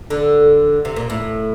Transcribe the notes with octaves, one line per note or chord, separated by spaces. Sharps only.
D3
C3
A#2
A2